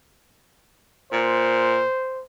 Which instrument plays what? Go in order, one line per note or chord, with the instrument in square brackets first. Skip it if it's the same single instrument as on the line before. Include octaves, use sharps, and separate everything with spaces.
[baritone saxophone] A#2 [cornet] C5